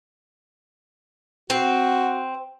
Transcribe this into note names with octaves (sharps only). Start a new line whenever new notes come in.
C4 F#4